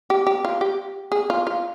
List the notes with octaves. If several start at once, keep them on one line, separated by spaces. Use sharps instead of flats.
G4
G4
F4
G4
G#4
F4
F4